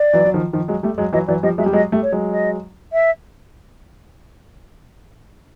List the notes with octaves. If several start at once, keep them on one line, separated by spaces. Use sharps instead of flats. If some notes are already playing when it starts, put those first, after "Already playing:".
Already playing: D5
E3 F#3
F#3
D#3 F3
D#3 F3
F#3 G#3
G3 A3
F#3 G#3
E3 F#3 D#5
E3 F#3 D5
F3 G3 D#5
F#3 G#3 E5
G3
F#3 G#3 D#5
G3 A3
C#5
F#3 G#3
D#5
E5